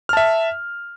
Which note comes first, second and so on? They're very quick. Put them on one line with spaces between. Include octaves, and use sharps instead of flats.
F6 A5 E5